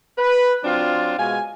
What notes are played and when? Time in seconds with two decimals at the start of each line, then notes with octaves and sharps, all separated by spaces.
0.18 B4
0.64 F#3 C4 D4 F4
1.19 B2 G#3 F5 G#5